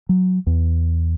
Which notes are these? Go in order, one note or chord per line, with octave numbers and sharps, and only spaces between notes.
F#3
E2